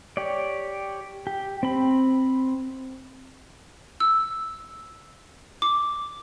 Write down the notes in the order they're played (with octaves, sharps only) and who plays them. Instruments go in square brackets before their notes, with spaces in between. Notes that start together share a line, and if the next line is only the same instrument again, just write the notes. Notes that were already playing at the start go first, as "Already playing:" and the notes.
[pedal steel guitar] G4 C#5 D5
G4
C4 B5
[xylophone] E6
D6